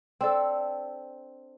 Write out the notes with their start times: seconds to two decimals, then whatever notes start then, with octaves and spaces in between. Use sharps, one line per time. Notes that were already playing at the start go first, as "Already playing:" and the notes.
0.21 C4 D4 A4